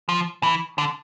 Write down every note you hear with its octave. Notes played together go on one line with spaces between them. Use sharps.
F3
E3
D3